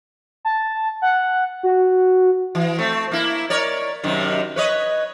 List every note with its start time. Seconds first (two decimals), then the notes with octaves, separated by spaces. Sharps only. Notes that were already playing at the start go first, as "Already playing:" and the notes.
0.45 A5
1.02 F#5
1.63 F#4
2.55 E3
2.78 A3 C4
3.11 A#3 E4
3.50 A#4 C#5 D5
4.03 F#2 C3 D#3
4.56 B4 C#5 D#5